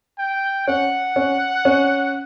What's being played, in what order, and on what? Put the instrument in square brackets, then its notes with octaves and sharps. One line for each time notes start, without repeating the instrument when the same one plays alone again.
[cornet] G5
[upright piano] C#4 [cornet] F#5
[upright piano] C#4
C#4